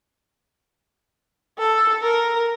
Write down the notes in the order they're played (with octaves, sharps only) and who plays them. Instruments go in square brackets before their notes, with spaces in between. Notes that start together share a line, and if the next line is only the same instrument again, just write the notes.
[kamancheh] A4
A#4